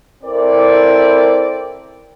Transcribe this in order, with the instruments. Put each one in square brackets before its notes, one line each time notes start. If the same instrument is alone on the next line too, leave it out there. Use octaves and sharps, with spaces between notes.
[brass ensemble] C4 E4 A4 A#4 D5